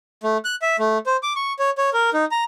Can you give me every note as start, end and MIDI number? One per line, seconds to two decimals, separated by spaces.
0.23 0.37 57
0.45 0.55 90
0.62 0.76 76
0.79 0.98 57
1.06 1.17 72
1.23 1.33 86
1.36 1.53 85
1.59 1.70 73
1.78 1.90 73
1.93 2.10 70
2.13 2.25 63
2.31 2.44 82